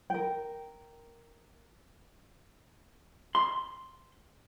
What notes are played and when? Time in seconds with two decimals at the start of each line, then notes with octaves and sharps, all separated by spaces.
0.10 A#4 G5
3.35 C6